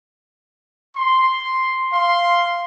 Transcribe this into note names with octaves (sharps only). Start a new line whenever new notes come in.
C6
F5 C6